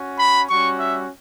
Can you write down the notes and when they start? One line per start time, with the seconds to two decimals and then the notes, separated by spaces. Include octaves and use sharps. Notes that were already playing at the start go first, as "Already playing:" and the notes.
Already playing: C#4 F#4
0.19 B5
0.49 G3 C#4 F#4 C#6
0.79 E5